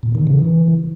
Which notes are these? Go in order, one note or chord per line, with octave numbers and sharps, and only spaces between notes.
A#2
D#3
C#3
E3